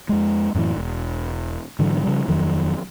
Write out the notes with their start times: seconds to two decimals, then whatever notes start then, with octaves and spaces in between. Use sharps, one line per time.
0.09 F2 G#3
0.54 F#2 A2 C3 E3
0.76 E1
1.79 G#2 D3 E3 F#3
2.03 C#3 E3 F3 G3
2.27 D#1 F2 D#3 F#3